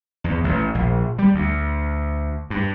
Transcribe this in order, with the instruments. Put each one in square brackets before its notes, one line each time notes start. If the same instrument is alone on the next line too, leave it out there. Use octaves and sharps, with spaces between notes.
[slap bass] E2
A1
A#1
G3
D2
G2